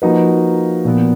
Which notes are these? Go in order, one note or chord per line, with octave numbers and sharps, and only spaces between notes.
F3 A#3 D#4 F#4 B4
A#2 F3 B3